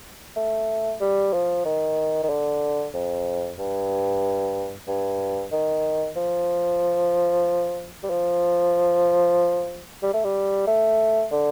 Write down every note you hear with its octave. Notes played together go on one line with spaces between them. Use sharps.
A3
G3
F3
D#3
D#3
D3
F2
G2
G2
D#3
F3
G3
F3
G3
A3
G3
A3
D3